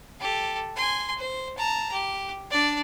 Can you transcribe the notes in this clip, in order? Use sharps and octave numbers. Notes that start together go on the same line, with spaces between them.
G4 A4
G#5 C6
C5
A5 A#5
G4
D4 D5